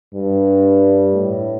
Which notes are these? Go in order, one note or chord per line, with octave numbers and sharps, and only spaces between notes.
G2
A2